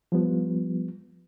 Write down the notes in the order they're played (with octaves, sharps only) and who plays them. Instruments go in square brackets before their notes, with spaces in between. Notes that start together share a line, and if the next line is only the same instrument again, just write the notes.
[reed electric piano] F3 G3 B3